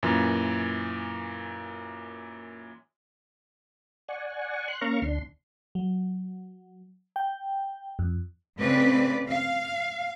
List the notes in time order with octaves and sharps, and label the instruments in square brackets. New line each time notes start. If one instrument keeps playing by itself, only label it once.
[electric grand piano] F#2 A#2 E3
[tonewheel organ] D5 F#5 G#5 C#6
C6 F#6
A#3 C#4 F5 A#5 C#6
D2 D4 C6
[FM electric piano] F#3
G5
F2
[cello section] A2 C#3 C4 B4 D5
F5